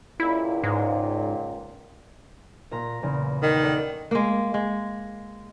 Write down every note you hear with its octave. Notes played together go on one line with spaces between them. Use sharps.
C#2 A#2 E4
G#2
A#2 A#5
E2 A#2 C#3
D#3 F#5 G5
A4 D5 F#5
G#3 A#3
G#3